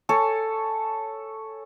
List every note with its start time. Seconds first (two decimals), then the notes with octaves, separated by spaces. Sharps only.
0.09 A4 C#5 G#5